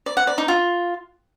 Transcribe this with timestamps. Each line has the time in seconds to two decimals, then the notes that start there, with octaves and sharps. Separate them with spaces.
0.06 D5
0.17 F#5
0.27 D5
0.38 D#4
0.48 F4